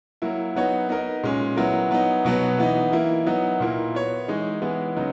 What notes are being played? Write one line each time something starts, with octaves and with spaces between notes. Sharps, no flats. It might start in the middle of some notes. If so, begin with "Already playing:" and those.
F#3 A#3 E4
F#3 B3 D#4 F#4 C#5
B3 D#4 A#4 D#5
A#2 G#3 C#4
F#3 B3 E4 A#4
F#3 B3 D#4
B2 F#3 B3 F#4
E3 B3 D#4
E3 A#3 E4
F#3 B3 D#4
A#2 A#3 E4
B3 F#4 C#5
E3 G#3 D#4
E3 G#3 B3 E4
C#3 F#3 B3 D#4